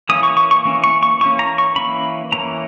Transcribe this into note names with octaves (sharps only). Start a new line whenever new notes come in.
E3 A#3 C#4 D#6
C#6
C#6
C#6
E3 A#3 C#4
C#6
C#6
E3 A#3 C#4 C#6
A#5
C#6
E3 A#3 C#4 B5
E3 A#3 C#4 A#5